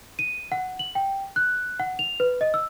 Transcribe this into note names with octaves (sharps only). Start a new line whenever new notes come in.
D#7
F#5
F#7
G5
F#6
F#5
F7
B4
D#5
E6